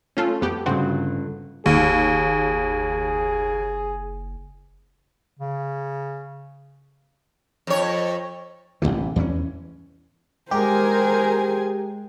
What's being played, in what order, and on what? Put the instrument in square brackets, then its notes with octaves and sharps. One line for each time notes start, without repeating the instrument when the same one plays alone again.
[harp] A3 [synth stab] C#4 F4 A4
[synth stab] F2 B3 G4
[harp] G1 F#6 [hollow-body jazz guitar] G2 C#3 [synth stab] C4 F#4
[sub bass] F#1 [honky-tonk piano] D#2 [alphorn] G#4
[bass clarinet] C#3
[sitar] F2 C#5
[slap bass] A1 A2 C3 E3
E2 E3 F#3 C#4
[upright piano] G#3 G5 [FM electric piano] G4 [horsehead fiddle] G#4 C5 [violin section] A#4 G#5